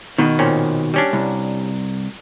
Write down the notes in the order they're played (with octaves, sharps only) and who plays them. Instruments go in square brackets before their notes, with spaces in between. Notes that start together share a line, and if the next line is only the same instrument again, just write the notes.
[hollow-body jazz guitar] B2 D#3
[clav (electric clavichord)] A#2 C4 C#4
G3 C#4 D4
[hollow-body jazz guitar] C2